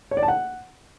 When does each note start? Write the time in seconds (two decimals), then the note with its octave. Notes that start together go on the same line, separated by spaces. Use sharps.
0.11 C#5
0.17 D5
0.23 A5
0.28 F#5